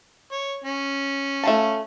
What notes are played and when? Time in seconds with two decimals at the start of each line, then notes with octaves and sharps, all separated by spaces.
0.32 C#5
0.64 C#4
1.44 A3 F4 A5